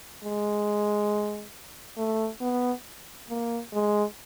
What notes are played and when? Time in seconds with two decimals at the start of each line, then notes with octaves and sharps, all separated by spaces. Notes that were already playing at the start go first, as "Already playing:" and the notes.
0.24 G#3
1.97 A3
2.41 B3
3.30 A#3
3.73 G#3